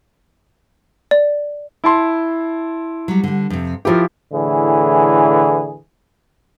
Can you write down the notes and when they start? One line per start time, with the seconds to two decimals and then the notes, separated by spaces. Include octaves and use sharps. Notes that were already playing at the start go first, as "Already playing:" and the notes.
1.11 D5
1.84 E4 A5 C6
3.08 F#3 G3
3.24 D3 G3
3.50 F2 C3
3.85 F3 E4 F4 G4 A4 A#4
4.32 A2 D3 E3 G#4